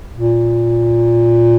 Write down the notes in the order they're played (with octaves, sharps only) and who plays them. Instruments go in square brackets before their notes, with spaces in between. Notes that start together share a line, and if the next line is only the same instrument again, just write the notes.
[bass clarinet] A#2